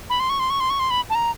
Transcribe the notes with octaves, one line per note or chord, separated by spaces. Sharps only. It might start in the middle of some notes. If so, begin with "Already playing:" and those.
B5
C6
C#6
C6
C#6
C6
C#6
C6
B5
A5
A#5